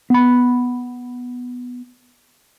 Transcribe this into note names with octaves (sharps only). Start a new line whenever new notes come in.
B3 B5